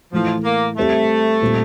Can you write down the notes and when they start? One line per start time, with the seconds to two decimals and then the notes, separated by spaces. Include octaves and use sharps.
0.12 A2 E3 F3 A3
0.44 A#3
0.76 G3 A3 C4 G4 C5
1.42 A#2 G3 C4 F4